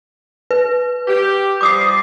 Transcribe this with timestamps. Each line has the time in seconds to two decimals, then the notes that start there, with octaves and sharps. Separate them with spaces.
0.51 B4
1.08 G4
1.61 F3 G3 D6 D#6 C7